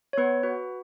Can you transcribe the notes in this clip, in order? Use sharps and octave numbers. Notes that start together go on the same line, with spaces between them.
C#5
B3 B4
F#4 B4